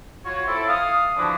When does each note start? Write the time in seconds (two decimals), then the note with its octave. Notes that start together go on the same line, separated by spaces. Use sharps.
0.25 F4 F#4 C#5
0.47 C4 E4 A4
0.68 F5 D#6
1.16 D3 E3 F3 D4 E4 F#4